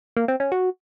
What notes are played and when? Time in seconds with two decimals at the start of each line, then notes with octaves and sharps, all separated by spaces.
0.17 A#3
0.28 C4
0.40 C#4
0.52 F#4